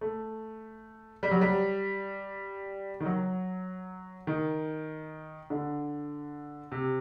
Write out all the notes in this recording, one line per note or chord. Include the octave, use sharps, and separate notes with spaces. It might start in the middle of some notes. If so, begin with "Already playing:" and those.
A3
G3
F#3
G3
D#3
F#3
D#3
D3
C3